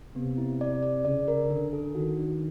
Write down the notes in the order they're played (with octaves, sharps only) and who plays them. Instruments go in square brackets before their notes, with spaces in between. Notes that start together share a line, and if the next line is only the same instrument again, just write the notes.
[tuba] C3 [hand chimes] B3
[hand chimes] E4
D5
D5
[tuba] C#3 [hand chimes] D5
[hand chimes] A#4
[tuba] D3 [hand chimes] D4
[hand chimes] A4
[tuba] D#3 [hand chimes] F#4
[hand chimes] D4